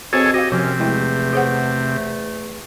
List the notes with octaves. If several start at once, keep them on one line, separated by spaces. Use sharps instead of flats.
B2 C4 F#4 G#4 A4 C5 C#5
C4 F#4 G4 D#5 F5
F#2 C3 F3 C4 C#4
E2 G#3 A3 E4 G5
G#4 C5 F#5